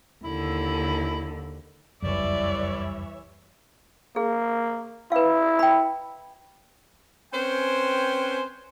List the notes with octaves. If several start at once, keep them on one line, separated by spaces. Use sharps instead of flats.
D#2 D3 E4
F1 C#2 F#2 E3 G3 C#5 D5 E5
A#3 G#4
E4 B4 F5
G5 B5
C4 C#4 B4 C5 G5 G#5